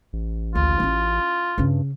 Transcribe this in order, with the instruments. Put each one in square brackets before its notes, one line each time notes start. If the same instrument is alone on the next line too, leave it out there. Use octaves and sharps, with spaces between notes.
[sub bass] A1
[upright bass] F#1 D2 [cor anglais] F4
[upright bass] C#4 E4
[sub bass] G2 [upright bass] C#3 C#4